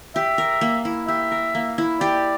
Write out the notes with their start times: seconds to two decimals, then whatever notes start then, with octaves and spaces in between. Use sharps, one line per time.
0.15 G4 E5
0.38 A#4
0.61 A#3
0.85 E4
1.08 G4 E5
1.31 A#4
1.55 A#3
1.78 E4
2.01 G4 D5